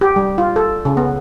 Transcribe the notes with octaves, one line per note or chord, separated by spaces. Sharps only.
G4
G3
F4
A4
C#3
B3